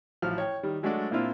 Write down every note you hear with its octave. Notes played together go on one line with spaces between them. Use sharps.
A1 F3 F#3 F6
C#5 G5
D#3 G3
F#3 G#3 A3 D4 F#4 D5
A#2 A#3 C4 D4 E4 F4